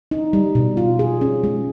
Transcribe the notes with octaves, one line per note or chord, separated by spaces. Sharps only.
D#4
G3
B2
F4
G#4
C#4
G#3